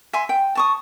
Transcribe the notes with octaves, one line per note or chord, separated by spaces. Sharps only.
E5 G#5 C6
G5
A5 C#6 D#6